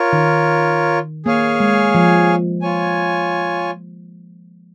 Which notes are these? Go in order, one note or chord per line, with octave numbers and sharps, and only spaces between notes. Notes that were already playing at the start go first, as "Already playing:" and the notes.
Already playing: F4 A#4 C#5
D#3
A#3 G#4 C#5 F5 G#5
G#3
F3
F4 C#5 G#5